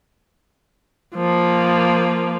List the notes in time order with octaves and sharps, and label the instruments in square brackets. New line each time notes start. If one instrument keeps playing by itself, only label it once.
[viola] F3 A#3